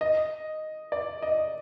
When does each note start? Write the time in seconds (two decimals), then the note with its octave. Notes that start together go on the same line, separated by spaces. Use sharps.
0.01 D#5
0.92 D5
1.22 D#5